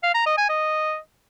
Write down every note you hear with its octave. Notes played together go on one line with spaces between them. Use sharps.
F5
A#5
D#5
G#5
D#5